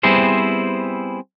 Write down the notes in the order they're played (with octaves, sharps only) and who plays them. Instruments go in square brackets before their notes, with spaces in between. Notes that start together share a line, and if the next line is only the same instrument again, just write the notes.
[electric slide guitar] G3 B3 C4 E4 G#4 C5